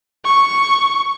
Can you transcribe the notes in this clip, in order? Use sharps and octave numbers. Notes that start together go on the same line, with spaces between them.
C#6